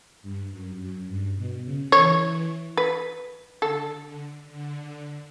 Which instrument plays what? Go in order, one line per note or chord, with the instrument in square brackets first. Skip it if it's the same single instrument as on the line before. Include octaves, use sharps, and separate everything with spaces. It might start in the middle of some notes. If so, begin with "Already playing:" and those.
[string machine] G2
F#2
F#2
G2
B2
C#3
[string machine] E3 [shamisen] C#5
[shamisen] B4
[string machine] D3 [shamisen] A4
[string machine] D3
D3